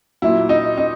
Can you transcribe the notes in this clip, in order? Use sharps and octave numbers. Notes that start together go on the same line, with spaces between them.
A#2 F#3 E4
D#4
D#4